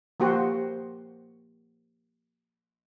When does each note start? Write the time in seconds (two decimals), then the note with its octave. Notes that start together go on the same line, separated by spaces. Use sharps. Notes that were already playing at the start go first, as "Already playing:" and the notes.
0.20 F3 A#3 F#4 G4 C5